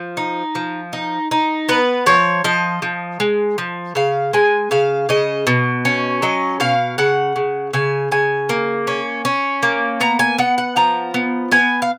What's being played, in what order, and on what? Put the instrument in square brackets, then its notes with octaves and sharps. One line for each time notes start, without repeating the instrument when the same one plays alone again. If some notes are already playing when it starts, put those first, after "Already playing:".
Already playing: [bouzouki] F3
D#4
F3
D#4
D#4
B3 B4
F3 C#5
F3 D#5
F3
G#3
F3
C#3 F5
G#3 G#5
C#3 F5
C#3 D#5
B2
C#4
F#3 D#5
B2 F5
C#3 F#5
C#3
C#3 G#5
C#3 G#5
A#3
C#4
C#4
A#3
B3 A#5
G#5
B3 F#5
F#5
F3 A#5
B3
B3 G#5
F5